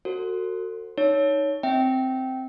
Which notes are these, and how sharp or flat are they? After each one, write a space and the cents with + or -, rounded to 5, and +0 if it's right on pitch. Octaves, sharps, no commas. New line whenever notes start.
F#4 +0 A4 +40 C5 +15
D#4 +0 C#5 +10
C4 +0 E5 -25 G5 -10